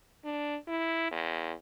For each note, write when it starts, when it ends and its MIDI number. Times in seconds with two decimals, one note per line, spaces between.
0.24 0.56 62
0.68 1.08 64
1.11 1.52 40